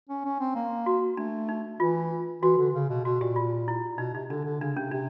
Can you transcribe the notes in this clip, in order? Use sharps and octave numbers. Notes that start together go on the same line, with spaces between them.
C#4
C#4
C4
A#3
F#4
A3 D4
D#4
E3 F4
E3 F#4
D3
C#3
B2
B2 F#4
A#2 G4
F4
E4
B2 D#4
C3 D#4
D3 D4
D3
C#3 D4
C3 C#4
C3 D4